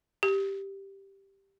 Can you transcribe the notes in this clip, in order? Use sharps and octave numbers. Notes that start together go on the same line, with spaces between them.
G4